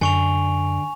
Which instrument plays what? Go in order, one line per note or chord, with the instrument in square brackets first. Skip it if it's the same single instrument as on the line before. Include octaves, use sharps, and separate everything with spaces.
[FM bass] F#2 [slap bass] D3 [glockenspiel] G#5 C#6 F7